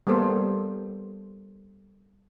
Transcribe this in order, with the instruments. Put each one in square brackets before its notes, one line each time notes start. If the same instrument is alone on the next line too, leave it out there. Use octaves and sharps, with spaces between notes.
[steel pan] G3 A#3 B3 A4 C5